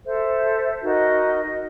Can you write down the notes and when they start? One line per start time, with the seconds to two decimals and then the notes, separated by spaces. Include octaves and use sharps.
0.06 A4 C5 E5
0.81 D#4 F#4 A#4 D#5